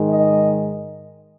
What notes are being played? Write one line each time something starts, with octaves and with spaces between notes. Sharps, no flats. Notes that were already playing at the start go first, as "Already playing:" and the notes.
Already playing: G#2 D#3 G#3
D#5